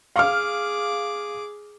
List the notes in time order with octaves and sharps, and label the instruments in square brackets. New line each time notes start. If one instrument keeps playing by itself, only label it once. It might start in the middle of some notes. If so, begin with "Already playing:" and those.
[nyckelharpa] G#4 D6 [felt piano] F5 F6